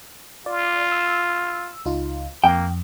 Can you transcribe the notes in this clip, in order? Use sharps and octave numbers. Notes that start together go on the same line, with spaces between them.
F4 D5
E6
C#2 D#4 F4
F2 A#3 G5